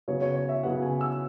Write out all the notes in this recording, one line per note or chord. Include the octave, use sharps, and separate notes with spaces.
C#3 F#3 B3 C#5
C#5
C#5
E5
C#3 F#3 B3 F#5
G#5
E6